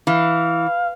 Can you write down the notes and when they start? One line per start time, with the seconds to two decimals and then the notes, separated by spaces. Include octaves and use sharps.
0.07 E3 F5